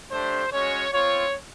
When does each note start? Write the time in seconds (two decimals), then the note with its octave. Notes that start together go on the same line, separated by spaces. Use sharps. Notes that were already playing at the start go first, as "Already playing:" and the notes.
0.12 A3 D4 G4 C5
0.52 G#3 C#4 F#4 C#5
0.93 C4 F4 C#5